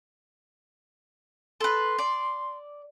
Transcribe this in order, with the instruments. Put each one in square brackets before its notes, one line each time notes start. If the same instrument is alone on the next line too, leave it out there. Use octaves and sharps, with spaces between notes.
[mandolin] A4 B4 [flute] C6
[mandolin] D5